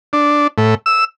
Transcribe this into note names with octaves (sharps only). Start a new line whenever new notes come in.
D4
A2
E6